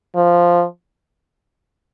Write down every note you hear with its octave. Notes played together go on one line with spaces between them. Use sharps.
F3